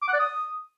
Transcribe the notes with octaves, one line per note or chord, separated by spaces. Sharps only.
D6
F#5
D5
D#6